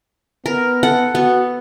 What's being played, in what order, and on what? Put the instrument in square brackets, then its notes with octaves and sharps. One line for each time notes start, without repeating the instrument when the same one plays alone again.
[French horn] B3 [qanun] A#4
[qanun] A4 F#5
[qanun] B3 [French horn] F#4